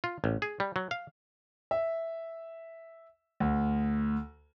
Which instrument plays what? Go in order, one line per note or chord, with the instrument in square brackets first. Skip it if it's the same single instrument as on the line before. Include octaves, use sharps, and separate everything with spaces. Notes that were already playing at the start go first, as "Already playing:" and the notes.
[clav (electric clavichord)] F4
A1
G#4
G3
F#3
F5
[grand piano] E5
D2